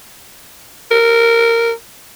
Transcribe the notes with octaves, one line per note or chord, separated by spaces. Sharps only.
A#4